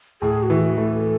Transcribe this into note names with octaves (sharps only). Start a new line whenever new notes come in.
A2 G#4
F#4
E3
F#4
A3
A4